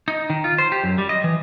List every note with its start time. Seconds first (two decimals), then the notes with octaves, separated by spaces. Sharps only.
0.08 D#4
0.30 D#3
0.44 F4
0.58 C5
0.72 G4
0.83 F#2
0.98 G3
1.09 D#5
1.24 E3